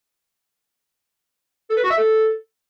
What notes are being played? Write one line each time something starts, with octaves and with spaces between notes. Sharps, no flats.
A4
B4
F#4
E5
A4